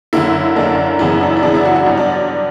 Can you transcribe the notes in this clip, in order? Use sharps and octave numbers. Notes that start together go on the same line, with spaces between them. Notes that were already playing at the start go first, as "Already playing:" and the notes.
F#2 D3 A#3 E4
F#2 D3 A#3 D4
F#2 C#3 E3 B3 E4
D4
E4
F#2 C#3 E3 B3 D4
E4
F#4
F#4
G2 F#3 B3 D4
D4